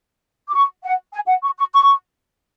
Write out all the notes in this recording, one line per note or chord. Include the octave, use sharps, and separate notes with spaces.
D6
C#6
F#5
G#5
F#5
C#6
C#6
C#6